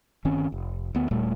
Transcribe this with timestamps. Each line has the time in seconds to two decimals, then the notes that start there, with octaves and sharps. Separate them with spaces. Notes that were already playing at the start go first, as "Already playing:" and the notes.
0.25 G1 D#3 C4 C#4
0.52 F1
0.95 D2 B3
1.11 D#1 A#2 G3 A3